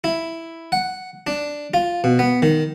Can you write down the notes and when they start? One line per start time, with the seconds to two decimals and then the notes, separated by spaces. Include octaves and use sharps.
0.04 E4
0.72 F#5
1.27 D4
1.74 F4
2.04 B2
2.19 B3
2.42 D#3